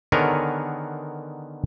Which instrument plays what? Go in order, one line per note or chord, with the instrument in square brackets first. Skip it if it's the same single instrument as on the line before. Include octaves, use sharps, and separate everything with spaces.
[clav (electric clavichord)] D3 D#3 B3 G#4 A#4 C#5